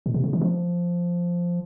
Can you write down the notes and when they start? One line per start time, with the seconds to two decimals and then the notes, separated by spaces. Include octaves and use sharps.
0.06 A#2
0.14 C3
0.24 C#3
0.33 E3
0.42 F3